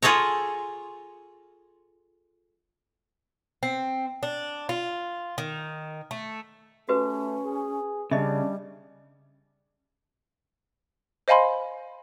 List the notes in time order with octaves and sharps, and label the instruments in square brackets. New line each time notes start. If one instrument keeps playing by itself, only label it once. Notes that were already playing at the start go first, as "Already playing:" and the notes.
[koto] F4 G#4 A4 C#5 A#5
[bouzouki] C4
D4
F4
D#3
A3
[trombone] A3 [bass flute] C#4 [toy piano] F#4 G4 B4
[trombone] G#4
[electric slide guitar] C#3 [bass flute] G3 [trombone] D4 [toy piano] D#5 E5
[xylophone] C5 D#5 F5 G#5 B5 C6